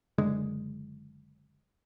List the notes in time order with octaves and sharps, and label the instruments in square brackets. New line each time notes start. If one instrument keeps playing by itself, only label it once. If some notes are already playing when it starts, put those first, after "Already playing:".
[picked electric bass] F#1 D3 G#3